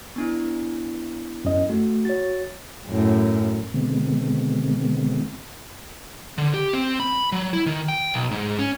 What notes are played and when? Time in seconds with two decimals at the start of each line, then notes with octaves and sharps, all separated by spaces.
0.16 B3 D4 E4
1.45 F#2 C#4 D#5
1.70 A3 F#4
2.05 F#4 C#5 A6
2.89 F#2 A2
3.74 B2 D3 D#3 G#3 B3 C4
6.38 D3
6.54 G4
6.73 C4
7.00 B5
7.32 F#3
7.53 E4
7.66 D#3
7.88 G5
8.14 B1
8.31 G#2
8.59 C#4